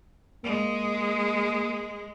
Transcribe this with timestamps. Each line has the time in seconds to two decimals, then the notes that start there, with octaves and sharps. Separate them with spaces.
0.43 G#3 A#3